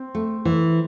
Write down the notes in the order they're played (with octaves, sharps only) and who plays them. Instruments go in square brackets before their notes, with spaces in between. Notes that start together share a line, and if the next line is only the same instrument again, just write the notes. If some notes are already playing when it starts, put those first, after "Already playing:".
Already playing: [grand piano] C4
[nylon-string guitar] A3
E3